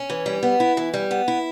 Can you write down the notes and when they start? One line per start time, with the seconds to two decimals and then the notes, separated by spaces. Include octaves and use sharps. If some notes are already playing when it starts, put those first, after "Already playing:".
Already playing: C#4
0.10 E3
0.26 G3
0.43 B3
0.60 E4
0.77 E3
0.94 G3
1.11 B3
1.28 E4